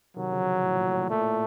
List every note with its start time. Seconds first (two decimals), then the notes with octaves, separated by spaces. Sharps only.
0.17 C3 D#3 F#3
0.32 C#3 F3
0.63 A2
0.75 A#2
0.87 A2
0.99 A#2
1.10 A#2 A3
1.19 A2